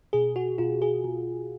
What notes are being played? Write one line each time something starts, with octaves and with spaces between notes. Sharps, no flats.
B2 G#4
F#4
B2 F4
G#4
B2